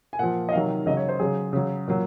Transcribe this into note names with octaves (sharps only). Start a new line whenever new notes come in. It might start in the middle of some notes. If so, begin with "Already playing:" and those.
G#5
A#2 F3 F#5
D#5
C3 D#3 F#3 F5
C#3 F#3 D#5
C#5
C5
C#3 F#3 G#4
C#3 F#3
A#2 F#3